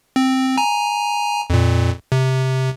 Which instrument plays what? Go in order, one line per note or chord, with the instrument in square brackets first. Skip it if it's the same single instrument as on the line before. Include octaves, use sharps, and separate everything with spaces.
[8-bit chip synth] C4
G#5 A#5
F2 A#2
C3